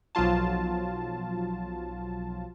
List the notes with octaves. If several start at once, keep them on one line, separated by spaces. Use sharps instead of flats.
B1 F3 F#3 F4 A5